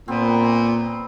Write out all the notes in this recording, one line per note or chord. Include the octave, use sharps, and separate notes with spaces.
A#2 B3 C4